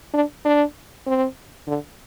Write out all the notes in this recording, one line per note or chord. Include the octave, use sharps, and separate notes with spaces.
D4
D4
C4
D3